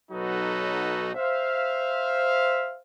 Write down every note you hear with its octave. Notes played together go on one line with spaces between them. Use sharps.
B1 F#3 D#4 F#4 A4 B4
C5 E5 F5